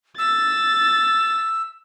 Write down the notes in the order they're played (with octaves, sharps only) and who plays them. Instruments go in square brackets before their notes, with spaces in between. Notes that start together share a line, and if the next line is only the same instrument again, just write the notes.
[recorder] E6 [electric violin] A6